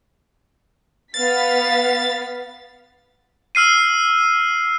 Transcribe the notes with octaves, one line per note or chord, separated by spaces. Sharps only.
B3 F5 A6 B6
E6 F6 C7 D#7